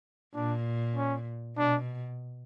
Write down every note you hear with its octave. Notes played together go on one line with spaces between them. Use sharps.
A#2 D4
C#4
B2 D4